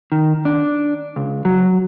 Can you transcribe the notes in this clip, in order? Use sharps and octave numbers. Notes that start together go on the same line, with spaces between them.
D#3
D4
C#2
F#3